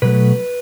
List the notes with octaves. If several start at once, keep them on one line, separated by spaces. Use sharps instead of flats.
B2 F#3 A3 B4